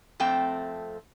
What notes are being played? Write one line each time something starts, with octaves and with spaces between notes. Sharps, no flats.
F2 A3 C4 G5